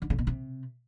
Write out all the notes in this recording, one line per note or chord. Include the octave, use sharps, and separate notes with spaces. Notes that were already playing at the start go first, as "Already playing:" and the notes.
D3
C#3
B2
C3